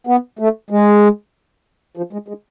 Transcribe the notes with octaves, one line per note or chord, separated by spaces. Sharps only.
B3
A3
G#3
F3
G#3
G#3